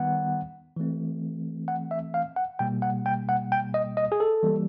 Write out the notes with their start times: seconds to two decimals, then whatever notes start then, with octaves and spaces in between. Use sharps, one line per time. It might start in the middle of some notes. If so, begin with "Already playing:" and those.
Already playing: D#3 G3 B3 F#5
0.76 E3 A3 C4
1.68 F#5
1.91 E5
2.14 F5
2.36 F#5
2.59 B2 G3 A#3 G5
2.82 F#5
3.06 G5
3.29 F#5
3.52 G5
3.74 D#5
3.97 D#5
4.12 G#4
4.20 A4
4.43 E3 G3 A#3